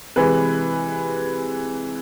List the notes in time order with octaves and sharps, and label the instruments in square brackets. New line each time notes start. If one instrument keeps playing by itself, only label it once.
[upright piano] C3 E3 G#3 B4